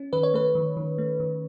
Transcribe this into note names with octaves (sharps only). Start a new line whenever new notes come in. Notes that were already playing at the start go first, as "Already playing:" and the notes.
Already playing: C#4
D#3 B4
C#5
A3 B4
D#3
D#3
A3
D#3